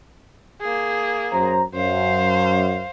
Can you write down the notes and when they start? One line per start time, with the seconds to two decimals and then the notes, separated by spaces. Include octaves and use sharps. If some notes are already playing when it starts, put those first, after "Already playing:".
0.61 A#3 G#4
1.32 F#2 C5 A#5
1.75 F#2 C5 F5